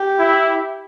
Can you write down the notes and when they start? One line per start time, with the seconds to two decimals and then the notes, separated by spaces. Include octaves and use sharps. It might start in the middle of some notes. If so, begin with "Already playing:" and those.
Already playing: G4
0.19 E4